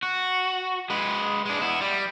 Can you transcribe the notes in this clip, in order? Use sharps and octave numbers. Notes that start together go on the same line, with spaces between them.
F#4
G#3 B4
G#3 D4
B3 E4
G3